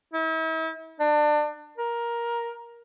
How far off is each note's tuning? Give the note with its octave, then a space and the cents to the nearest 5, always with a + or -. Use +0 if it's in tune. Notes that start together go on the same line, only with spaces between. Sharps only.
E4 -40
D4 +30
A#4 +15